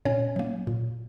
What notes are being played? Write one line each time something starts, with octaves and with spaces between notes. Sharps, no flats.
A#2 C#4 C#5
F#3 A#3
A#2